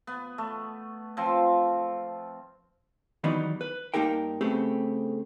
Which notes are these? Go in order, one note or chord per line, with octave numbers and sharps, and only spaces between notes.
B3
A3
F3 C4
D#3 E3 F#3 G3 B3 D#4
B4
G2 A#3 D#4 G4 A#4 G5
C#3 A3 B3 C4 G4 G#4